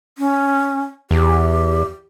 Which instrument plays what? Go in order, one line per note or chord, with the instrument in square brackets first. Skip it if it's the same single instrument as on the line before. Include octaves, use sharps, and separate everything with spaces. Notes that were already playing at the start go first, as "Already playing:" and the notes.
[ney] C#4
[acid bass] E2 [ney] G4